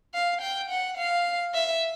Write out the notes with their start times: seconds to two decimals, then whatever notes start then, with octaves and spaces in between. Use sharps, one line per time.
0.14 F5
0.42 G5
0.70 F#5
0.97 F5
1.54 E5